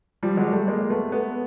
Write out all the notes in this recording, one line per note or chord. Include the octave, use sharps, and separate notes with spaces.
F3 G3
F#3 G#3
G3 A3
G#3 A#3
A3 B3
A3 B3